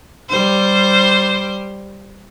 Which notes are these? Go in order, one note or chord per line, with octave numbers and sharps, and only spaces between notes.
G3 C5